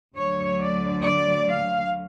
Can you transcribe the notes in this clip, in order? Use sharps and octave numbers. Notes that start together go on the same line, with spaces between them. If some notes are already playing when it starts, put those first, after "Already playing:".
D2 D3 F#3 C#5
D5
D5
F5